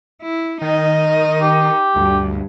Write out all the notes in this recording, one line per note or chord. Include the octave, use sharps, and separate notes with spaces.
E4
D#3 D#4 D#5
G4
D2 G2